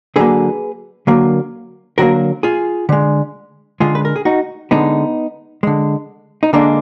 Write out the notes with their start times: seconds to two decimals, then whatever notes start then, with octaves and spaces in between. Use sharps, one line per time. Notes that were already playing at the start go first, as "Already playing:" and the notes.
0.16 D3 F#3 A#3 G#4 B4
1.07 D3 F#3 A#3
1.98 D3 F#3 A#3 F#4 A#4
2.43 F4 G#4
2.89 D3 G#3
3.80 D3 G#3 F4 G#4
3.95 B4
4.05 A#4
4.16 G#4
4.25 D#4 F#4
4.71 D3 G#3 B3 D#4
5.63 D3 G#3
6.43 D#4
6.53 D3 G#3 A#3 D4